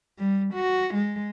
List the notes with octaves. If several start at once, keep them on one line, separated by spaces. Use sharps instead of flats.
G3
F#4
G#3